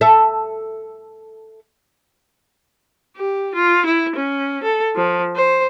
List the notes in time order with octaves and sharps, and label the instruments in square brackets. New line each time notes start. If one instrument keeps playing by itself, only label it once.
[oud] A4 E5
[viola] G4
F4
E4
C#4
A4
F3
C5